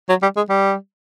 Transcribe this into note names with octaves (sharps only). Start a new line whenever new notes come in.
F#3
G3
G#3
G3